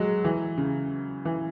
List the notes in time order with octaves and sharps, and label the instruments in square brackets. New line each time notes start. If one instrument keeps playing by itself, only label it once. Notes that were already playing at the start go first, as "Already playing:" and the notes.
Already playing: [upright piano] F#3 G#3
E3
C#3
E3